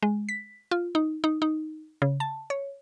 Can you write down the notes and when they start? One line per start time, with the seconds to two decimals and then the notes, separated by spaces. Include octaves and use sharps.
0.03 G#3
0.29 B6
0.71 F4
0.95 D#4
1.24 D#4
1.42 D#4
2.02 C#3
2.20 A5
2.50 C#5